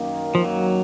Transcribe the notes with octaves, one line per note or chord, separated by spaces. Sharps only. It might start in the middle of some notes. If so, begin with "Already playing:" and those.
Already playing: F#2 D#3 A#3
F3
F#3